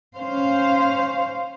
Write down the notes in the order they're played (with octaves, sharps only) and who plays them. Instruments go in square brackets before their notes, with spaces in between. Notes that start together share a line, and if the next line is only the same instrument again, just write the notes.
[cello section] C#4 C5 F5